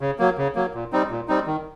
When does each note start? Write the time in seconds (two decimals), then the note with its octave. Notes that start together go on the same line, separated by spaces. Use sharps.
0.01 C#3
0.19 F#3 A#3
0.38 C#3
0.55 F#3 A#3
0.74 A#2
0.92 G3 C4 D#4
1.11 A#2
1.28 G3 C4 D#4
1.47 D#3